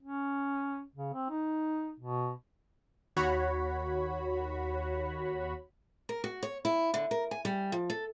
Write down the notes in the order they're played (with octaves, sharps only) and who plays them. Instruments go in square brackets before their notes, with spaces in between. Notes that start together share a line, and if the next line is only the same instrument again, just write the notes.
[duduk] C#4
C#3
C4
D#4
B2
[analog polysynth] D#2 F#4 C#5 B5
[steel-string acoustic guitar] A#4
F#4
C#5
E4
D3
A#4
G#5
G3
F3
A4